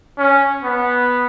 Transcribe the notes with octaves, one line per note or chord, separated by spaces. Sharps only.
C#4
B3